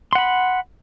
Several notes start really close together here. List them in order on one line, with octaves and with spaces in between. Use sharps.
C6 F#5 B5